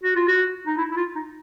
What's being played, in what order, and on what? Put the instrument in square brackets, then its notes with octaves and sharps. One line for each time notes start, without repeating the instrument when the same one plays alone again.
[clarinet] F#4
F4
F#4
D#4
E4
E4
F4
D#4